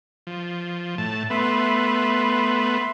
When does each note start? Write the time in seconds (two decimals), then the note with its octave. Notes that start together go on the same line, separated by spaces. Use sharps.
0.27 F3
0.98 A2 A5
1.30 A3 B3 E5 B5 C6